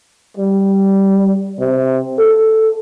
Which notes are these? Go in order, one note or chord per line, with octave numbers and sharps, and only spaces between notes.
G3
C3
A4